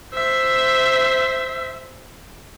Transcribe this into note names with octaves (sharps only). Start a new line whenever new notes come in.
C5 E5